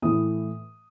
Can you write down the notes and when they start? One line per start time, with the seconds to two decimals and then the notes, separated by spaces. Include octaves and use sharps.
0.02 A2 E3 D#6